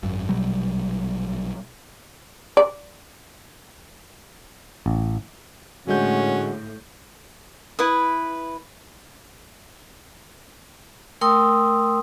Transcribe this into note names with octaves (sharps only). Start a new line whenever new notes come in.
G#1 F#2
A#1 B2 F#3 G3
D5
A1
A2 D3 G#3 C#4 F#4 G6
E4 B4 D#6
A3 A#4 G5 C6 D#6 E6